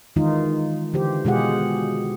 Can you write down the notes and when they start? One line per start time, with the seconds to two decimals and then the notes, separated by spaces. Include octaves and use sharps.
0.16 D#3 E3 G#3 D#4 F4
0.94 D3 E3 G4 C5
1.25 B2 G#3 F4 G4 G#4 F#5